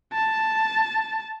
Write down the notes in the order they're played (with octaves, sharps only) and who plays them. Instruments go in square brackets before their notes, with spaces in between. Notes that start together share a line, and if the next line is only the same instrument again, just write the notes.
[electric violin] A5